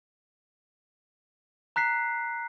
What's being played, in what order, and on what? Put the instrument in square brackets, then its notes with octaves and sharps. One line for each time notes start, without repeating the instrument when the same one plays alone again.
[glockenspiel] A#5 F#6 B6 C7